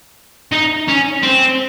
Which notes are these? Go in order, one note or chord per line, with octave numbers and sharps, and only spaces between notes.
D#4
C#4
C4